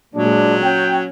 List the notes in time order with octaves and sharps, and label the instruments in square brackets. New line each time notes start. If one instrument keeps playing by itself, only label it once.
[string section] A#2 G#3 [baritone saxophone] F#3 [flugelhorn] D4
[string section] C#4 [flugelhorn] G5